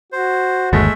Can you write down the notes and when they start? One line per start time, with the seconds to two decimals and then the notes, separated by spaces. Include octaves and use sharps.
0.12 F#4 C5
0.73 G1 D#2 G#3 A3 E5